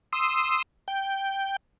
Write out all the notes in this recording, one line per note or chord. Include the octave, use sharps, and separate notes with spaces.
C6 D#6 E6
G5